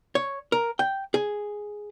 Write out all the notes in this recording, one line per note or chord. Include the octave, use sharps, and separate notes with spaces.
C#5
A#4
G5
G#4